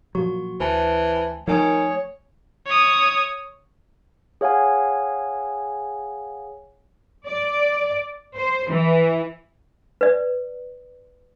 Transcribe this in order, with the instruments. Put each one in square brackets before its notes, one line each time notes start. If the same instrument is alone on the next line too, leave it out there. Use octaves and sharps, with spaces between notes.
[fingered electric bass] A#2 F3 F#3 [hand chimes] F#4 C#6
[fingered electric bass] D2 [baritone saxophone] E3 [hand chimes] B4 C5 A5
[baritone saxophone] D#3 [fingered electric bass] F3 A3 [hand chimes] D#4 G#5 D#6 [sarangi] C#5
[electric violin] C#5 D#6
[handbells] G#4 C#5 F5 F#5 G#5
[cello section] D5
C5
E3
[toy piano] B4 D5